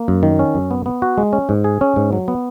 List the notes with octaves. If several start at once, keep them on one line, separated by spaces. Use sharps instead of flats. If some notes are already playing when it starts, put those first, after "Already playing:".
Already playing: A#3
F#2
D#3
C#4
F#2
B3
B3
F#4
G#3
C#4
G#2
G#4
C#4
G#2
F#3
B3